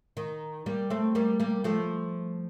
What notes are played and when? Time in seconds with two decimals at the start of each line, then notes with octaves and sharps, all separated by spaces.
0.17 D#3
0.66 G3 A#3
0.90 A3 C4
1.15 G3 A#3
1.40 G3 A#3
1.64 F3 A3